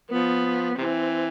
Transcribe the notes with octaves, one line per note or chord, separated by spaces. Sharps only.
F3 B3
C3 E3 C4